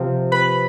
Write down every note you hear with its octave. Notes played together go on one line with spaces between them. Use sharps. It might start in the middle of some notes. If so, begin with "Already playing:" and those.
Already playing: C3 F3 C4
B4 B5